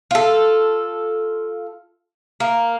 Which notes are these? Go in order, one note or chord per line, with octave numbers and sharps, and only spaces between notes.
F4 A4
A#3